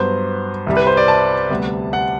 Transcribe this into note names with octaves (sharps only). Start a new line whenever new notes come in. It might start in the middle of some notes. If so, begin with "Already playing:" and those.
Already playing: G2 F#3 B3 C5
C2 C3 G3
B4
C5
D5
A5
D2 C3 G3 B3
F#5